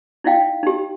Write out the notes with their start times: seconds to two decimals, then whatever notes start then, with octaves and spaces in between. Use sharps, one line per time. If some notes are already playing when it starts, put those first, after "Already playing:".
0.24 D#4 E4 D#5 F5 G5
0.63 D#4 G4